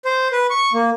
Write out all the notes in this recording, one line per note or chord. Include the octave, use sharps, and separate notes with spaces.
C5
B4
C#6
A#3